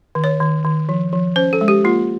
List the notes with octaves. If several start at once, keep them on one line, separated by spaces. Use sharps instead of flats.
D#3
C#5
D#3
D#3
F3
F3
C#4 C5
A4
G#3
G4
A#3 F4